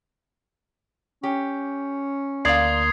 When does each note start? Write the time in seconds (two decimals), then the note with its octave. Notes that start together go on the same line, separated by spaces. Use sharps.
1.23 C#4 G4
2.45 D2 A#3 D5 F5 C6 D#6 G#6 C7